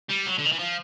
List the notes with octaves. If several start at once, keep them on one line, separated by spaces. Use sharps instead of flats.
G3
F#3
D3
D#3
E3
F3